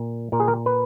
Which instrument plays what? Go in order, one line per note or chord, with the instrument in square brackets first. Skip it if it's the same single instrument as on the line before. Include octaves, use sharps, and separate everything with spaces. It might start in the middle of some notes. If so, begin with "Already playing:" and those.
Already playing: [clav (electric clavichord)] A#2
A#2 A#4
G#4
A#4
B4